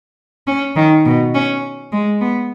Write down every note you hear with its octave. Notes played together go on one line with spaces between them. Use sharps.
C#4
D#3
B2
C#4
G#3
B3